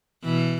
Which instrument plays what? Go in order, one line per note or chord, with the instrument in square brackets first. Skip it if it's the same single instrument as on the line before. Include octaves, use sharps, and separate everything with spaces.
[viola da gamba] B2 E3